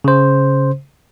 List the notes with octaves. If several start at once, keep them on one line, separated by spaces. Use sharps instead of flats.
C#3 C5